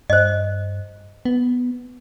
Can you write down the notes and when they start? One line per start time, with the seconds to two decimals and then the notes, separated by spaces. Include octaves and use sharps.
0.10 G2 C5 D#5
1.25 B3